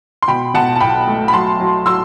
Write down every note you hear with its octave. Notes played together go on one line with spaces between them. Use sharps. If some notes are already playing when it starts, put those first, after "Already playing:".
C6
B2 G5 B5
B2 F#5 A5
A5
B1 G5 B5
A3
B5
F#3 A5 C6
F#3
F#3 C6 E6